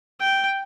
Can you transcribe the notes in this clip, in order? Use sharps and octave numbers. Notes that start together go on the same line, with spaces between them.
G5